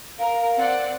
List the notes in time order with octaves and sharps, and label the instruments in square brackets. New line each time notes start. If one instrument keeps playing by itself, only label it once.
[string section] A#4 [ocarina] F5
[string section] C4 D5 F#5